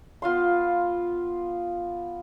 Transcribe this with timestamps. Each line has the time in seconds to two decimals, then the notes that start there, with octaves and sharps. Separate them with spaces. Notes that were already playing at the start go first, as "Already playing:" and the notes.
0.22 B3 F4 F5 C6